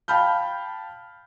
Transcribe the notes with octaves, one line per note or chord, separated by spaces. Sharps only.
F5 G5 A5 B5 F6 G6